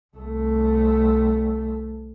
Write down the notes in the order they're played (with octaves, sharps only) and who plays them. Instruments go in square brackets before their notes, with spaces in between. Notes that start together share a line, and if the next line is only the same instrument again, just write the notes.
[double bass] C2 A3